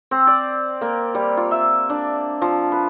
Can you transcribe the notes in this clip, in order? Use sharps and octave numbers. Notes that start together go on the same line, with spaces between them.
C4
D5
A#3
G3
F4
E5
D4
F3
B4